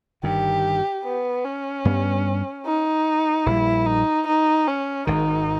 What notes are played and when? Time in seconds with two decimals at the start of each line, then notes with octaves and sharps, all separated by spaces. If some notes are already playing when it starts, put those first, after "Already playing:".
0.23 G1 G2 D#3 G4
1.04 B3
1.44 C#4
1.85 G2 G3 B3
2.66 D#4
3.46 A#1 A#2 G3 E4
3.86 D#4
4.27 D#4
4.67 C#4
5.07 G#1 G#2 D#3 D#4